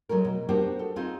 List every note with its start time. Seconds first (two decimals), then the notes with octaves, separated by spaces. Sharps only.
0.09 F#3 G#3 A3 A#4
0.25 B2
0.49 B3 D4 F#4 G4 A#4 C5
0.79 A4
0.96 C4 D#4 F4 G#4